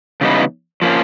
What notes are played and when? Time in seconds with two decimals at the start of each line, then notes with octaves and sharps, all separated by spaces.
0.21 C#3 E3 G3 B3 D#4
0.82 F3 A#3 C#4